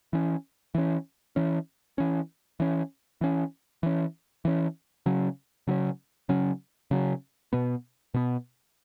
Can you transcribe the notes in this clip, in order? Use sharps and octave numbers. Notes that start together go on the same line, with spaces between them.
E3 C#4
E3 C#4
E3 C#4
E3 C#4
E3 C#4
E3 C#4
E3 C#4
E3 C#4
C#3 F#3 C#4
C#3 F#3 C#4
C#3 F#3 C#4
C#3 F#3 C#4
B2 B3
B2 B3